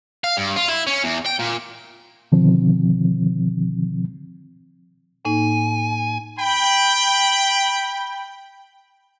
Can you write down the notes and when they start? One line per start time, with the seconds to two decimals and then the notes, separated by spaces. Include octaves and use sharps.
0.24 F5
0.37 G2
0.56 F4
0.68 E4
0.87 C#4
1.04 E2
1.26 G5
1.39 A#2
2.32 B2 D3 D#3 F3 C4
5.25 A2 A#3 D#4 G#5
6.39 G5 B5